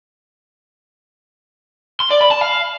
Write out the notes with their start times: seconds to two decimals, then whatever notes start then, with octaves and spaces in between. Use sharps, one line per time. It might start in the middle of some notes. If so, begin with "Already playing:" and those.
2.00 C6
2.10 D5
2.21 B5
2.31 A5
2.41 F5